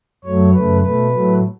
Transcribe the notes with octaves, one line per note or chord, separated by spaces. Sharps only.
F#2 F#3 A3 C#5
F#2 C#3 A3 B4
B2 A3 B4
A2 F#3 A3